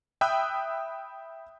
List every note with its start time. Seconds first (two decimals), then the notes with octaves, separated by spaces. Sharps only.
0.21 E5 G5 B5 D#6 E6 F#6